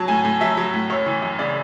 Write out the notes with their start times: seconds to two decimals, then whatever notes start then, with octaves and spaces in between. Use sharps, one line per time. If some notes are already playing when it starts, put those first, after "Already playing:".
Already playing: F#3 A5
0.08 A2 G#5
0.25 A2
0.41 F#3 E5
0.57 F#3
0.74 A2
0.90 F#2 C#5
1.06 E3
1.22 F#2
1.39 C#3 D5